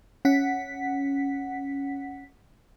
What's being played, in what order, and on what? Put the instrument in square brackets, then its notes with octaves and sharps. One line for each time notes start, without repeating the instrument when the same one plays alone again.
[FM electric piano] C#4 F#5 B6